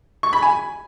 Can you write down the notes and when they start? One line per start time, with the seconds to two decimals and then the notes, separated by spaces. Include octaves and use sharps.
0.23 C#6
0.33 B5
0.42 G#5